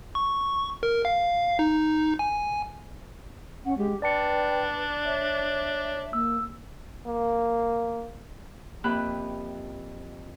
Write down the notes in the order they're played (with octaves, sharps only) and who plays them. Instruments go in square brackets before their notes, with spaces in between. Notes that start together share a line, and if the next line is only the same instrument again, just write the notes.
[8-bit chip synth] C#6
A#4
F5
D#4
G#5
[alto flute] C#4 [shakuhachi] F#5
[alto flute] G#3 [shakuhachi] G4
[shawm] D4 [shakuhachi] B4 [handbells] D5 A5 C#7 [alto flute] G5
[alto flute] C#5 [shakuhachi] E5
[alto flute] A#3 [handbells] E6
[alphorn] A#3
[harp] F2 A#3 G4 E5 B5 F#6